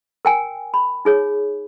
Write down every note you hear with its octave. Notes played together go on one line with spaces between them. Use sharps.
A#4 G5 G#5
B5
D#4 G#4 C#5